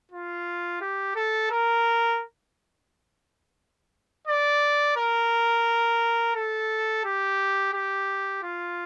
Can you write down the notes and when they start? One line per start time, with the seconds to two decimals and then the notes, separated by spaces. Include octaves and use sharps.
0.12 F4
0.81 G4
1.15 A4
1.51 A#4
4.27 D5
4.97 A#4
6.35 A4
7.05 G4
7.74 G4
8.43 F4